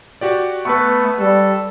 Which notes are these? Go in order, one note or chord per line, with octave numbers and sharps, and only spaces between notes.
F#4 G4 D5
A3 B3 B4 C#6
G3 A4